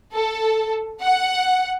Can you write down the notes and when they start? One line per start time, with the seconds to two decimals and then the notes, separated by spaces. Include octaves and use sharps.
0.15 A4
1.02 F#5